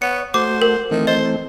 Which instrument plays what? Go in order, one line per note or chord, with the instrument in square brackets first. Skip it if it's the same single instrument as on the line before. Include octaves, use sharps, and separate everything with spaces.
[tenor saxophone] B3 [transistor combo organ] C#5 [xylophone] C#7
[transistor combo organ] A3 F#4 [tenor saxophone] C5 [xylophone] D6
[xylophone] A#4
[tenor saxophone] D#3 [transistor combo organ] E3 A3 C4
[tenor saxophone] C5 [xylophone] D#5